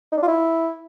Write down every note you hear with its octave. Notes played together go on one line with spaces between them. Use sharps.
D#4
D4
F4
E4